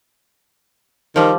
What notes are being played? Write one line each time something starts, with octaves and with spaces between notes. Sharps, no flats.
D#3 F3 G3